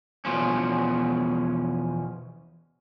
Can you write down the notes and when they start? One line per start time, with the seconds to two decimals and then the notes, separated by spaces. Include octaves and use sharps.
0.25 E2 B2 F3 C#4